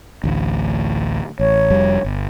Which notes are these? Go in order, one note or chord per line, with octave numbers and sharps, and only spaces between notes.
A1 D2 A2
A1 C#5
F1 F2 G3
G1